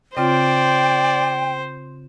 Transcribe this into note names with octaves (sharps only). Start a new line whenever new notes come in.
C#3 C4 F4 C5 D5 G5